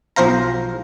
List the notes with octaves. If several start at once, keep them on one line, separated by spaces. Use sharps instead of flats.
B1 F3 C5 F5 A#5